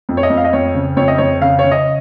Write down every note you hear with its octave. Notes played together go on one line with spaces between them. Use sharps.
F2
C#5
D#5
F2
F5
D#5
F2 C#5
C#3
F2 C#5
D#5
F2 C#5
C#3 F5
C#3 C#5
D#5